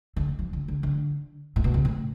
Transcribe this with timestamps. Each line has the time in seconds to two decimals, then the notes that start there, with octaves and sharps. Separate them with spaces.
0.16 D3
0.39 F3
0.53 D3
0.68 D3
0.83 D3
1.56 A2
1.64 B2
1.74 C#3
1.85 A2